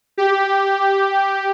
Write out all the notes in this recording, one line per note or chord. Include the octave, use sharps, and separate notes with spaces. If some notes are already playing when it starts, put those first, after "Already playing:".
G4